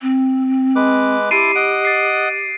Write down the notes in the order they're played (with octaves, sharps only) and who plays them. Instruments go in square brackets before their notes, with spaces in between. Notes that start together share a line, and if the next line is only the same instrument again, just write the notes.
[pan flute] C4
[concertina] G#3 B4 D6
[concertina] E4 A5 C6 [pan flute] G4 [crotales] C7 D7 D#7
[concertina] D#5 F#5 [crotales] D7
[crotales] A6 C7